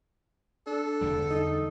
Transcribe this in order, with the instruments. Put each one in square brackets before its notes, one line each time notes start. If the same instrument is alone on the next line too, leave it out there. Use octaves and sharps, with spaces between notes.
[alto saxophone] D4 [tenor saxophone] A4
[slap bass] E2 D3 G3
[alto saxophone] D#4